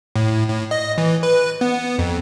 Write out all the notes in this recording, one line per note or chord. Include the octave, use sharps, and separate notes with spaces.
A2
A2
D#5
E3
B4
B3
F2